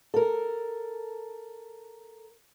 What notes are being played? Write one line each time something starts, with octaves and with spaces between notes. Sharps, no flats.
A4 A#4